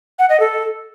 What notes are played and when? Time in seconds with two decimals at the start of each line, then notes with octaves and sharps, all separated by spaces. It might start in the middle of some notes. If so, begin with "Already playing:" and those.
0.19 F#5
0.29 D#5
0.40 A4